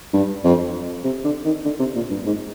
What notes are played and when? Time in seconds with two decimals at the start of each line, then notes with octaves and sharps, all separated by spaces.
0.13 G2
0.44 F2
1.04 C3
1.24 D3
1.45 D#3
1.64 D3
1.79 C3
1.95 A#2
2.10 G2
2.26 G#2